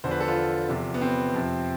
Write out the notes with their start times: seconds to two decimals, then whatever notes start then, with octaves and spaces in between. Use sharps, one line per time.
0.04 E2 D3 F3 C5
0.11 B4
0.20 A4
0.28 F4
0.69 E2 C3 F3
0.94 B3
1.01 C4
1.34 F2 C3 F3